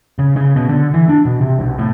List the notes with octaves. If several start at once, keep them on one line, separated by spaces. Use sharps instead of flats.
C#3
C#3
B2
D3
E3
D4
B2
C3
B1
A2